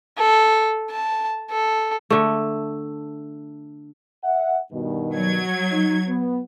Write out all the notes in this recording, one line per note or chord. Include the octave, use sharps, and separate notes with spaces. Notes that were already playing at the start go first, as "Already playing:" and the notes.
A4
A5
A4
D3 A3
E5 F#5
G2 B2 D#3
F#3 G#6
D#4
B3